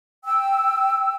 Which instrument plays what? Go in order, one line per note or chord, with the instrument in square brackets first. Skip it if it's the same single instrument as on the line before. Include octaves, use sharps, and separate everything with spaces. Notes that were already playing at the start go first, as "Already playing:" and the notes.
[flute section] G5 E6